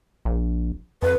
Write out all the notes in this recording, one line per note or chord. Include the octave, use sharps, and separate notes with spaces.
A#1
F2 B4